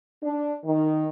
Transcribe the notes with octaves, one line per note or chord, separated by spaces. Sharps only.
D4
D#3